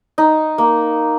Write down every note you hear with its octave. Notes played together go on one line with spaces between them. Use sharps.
D#4
A#3